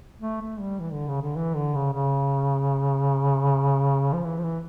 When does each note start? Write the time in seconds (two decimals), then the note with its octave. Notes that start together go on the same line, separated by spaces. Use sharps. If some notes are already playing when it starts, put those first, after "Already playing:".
0.21 A3
0.41 A3
0.60 G3
0.80 E3
0.93 D3
1.08 C#3
1.22 D3
1.36 E3
1.56 D3
1.75 C#3
1.93 C#3
4.13 F3
4.24 E3
4.38 F3
4.43 E3